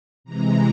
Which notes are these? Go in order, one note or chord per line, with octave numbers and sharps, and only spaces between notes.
C3 E3 G#3 A#5